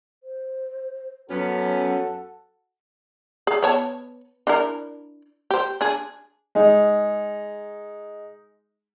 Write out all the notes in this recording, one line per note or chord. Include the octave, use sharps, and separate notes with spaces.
C5
F#2 F#3 B3 C#4 F#4 A4 F#5
G#4
B3 C#5 A5
D4 E4 A#4
G4 C5
D4 G#4
G#3 D#4